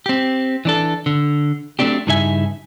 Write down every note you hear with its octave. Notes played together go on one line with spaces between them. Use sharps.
C4 G4
E3 D4 A4
D3
F#3 G3 A3 C4 D4 G4
G2 C#3 D#4 E4 E5 G#5